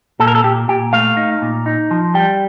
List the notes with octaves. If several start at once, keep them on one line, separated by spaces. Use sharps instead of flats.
A#2 A4
A#4
A4
A#2 G4
A#2 G4
A3 F5
D#4
A#2
D#4
F3
G3 G5